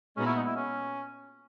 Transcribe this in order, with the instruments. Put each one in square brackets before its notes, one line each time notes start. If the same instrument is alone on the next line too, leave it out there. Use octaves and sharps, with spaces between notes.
[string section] A#2 G#3 B3 D#4 F#4 [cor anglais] C#4
[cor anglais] E4
D#4
E4
C#4